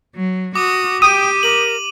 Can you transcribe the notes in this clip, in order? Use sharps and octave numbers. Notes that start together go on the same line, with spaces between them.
F#3
F#4 D6 D#6
G4 G5 D#6 D#7
A#4 F#7